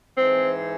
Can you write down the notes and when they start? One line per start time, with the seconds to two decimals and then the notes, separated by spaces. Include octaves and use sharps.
0.16 G#2 E3 C4